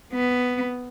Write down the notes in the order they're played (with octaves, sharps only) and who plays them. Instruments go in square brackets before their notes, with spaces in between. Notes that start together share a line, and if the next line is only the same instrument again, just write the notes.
[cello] B3